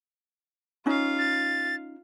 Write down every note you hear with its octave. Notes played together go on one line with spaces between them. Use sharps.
C#4 D#4 F4 F5
A6